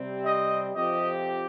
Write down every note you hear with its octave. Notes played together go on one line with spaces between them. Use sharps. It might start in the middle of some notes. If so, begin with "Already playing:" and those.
Already playing: C3 G3 C4
D#5
F2 C3 F3 C4 G4 D#5